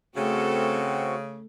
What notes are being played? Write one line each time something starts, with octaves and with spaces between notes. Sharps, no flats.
C#3 A3 C4 F#4 A4